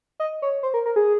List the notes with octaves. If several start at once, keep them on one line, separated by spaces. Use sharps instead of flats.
D#5
C#5
C5
A#4
A#4
G#4